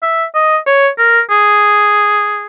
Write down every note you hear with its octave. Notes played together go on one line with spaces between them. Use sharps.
E5
D#5
C#5
A#4
G#4